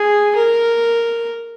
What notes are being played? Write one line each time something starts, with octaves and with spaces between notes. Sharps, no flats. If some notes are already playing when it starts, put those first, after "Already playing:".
Already playing: G#4
A#4